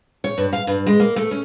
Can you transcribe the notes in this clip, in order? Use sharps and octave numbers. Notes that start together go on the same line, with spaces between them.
C#5
G2
F5
G2
G#3
A#3
A3
C#4